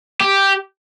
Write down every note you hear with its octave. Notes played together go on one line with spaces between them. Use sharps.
G4